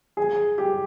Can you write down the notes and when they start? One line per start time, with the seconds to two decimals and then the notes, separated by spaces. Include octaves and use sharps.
0.17 G#4
0.58 G4